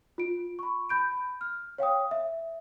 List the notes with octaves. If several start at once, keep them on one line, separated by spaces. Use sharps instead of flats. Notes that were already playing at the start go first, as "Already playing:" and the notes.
F4 D7
B5 C#6
B5 G6 D7
F6
C#5 F5 G5 D#6
E5